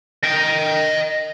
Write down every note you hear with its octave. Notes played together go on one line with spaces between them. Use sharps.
D#5 G5